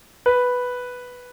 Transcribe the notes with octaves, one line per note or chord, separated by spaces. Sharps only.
B4